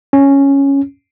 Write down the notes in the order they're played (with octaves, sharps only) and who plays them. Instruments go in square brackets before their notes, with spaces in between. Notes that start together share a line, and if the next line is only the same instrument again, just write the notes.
[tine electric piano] C#4